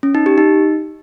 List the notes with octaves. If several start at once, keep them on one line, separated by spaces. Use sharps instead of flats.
C#4
D#4
G4
D#4